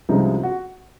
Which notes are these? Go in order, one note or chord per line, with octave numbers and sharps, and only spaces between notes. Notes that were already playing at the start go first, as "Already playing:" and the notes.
C2 C3 F3 G#3 C#4 D#4
F#4